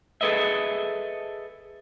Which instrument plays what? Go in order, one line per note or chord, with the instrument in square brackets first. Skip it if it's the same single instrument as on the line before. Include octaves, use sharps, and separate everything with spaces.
[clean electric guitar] G#4 A4 B4 D#5 E5